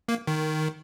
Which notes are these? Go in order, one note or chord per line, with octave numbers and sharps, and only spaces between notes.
A#3
D#3